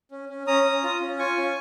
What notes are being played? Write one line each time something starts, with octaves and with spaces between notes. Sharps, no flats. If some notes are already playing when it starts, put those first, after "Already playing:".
C#4
C#4
C#4 A#5 D#6
C#4
F4
C#4
F4 G#5 C#6
C#4